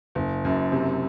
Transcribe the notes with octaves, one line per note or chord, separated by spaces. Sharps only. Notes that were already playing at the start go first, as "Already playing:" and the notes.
F#1
F#2
C3